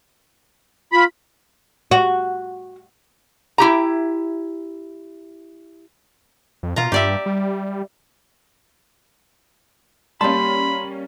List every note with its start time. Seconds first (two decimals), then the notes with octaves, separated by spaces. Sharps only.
0.92 F4 B5
1.91 F#4
3.58 E4 G4 A#5
6.63 F2
6.76 B2 F4 A#5
6.92 G2 G4 D5 E5
7.26 G3
10.21 G3 A#3 C#4 G4 A5 B5 C6